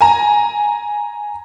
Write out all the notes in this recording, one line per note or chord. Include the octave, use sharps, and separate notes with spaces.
G#5 A#5